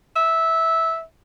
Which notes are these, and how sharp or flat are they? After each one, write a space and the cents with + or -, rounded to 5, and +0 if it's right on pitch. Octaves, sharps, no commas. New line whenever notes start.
E5 -10